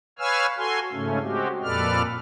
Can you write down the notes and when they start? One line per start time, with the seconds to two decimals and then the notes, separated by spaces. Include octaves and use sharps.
0.19 B4 C#5 F5 G#5 E6 F6
0.57 F#4 A4 G#5 C6
0.92 G#2 C#3 A3 C#4
1.23 G#3 C4 F#4 G4
1.63 F2 A#2 A4 B4 D5 F6